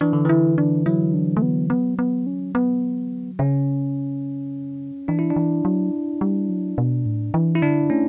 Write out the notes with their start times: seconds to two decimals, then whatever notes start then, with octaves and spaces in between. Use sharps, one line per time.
0.01 E3 D4
0.13 D3
0.25 E3 E4
0.58 D4
0.86 F#3 E4
1.14 D4
1.37 A3
1.42 B3
1.70 B3
1.99 B3
2.27 C#4
2.55 B3
3.39 C#3 C#4
5.08 E3 D4
5.19 E4
5.30 D4
5.36 E3
5.65 F#3
6.21 G3
6.49 F#3
6.78 B2
7.06 A2
7.34 E3
7.55 E4
7.62 D3 D4
7.90 A3 C#4